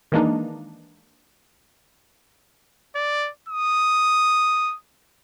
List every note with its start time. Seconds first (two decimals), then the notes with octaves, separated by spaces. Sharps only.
0.12 D#3 E3 G#3 A#3 D4 D#4
2.96 D5
3.49 D#6